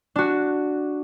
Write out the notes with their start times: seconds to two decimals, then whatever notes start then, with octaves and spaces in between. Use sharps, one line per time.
0.16 D4 F#4